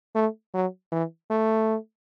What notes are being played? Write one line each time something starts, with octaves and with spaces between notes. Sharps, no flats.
A3
F#3
E3
A3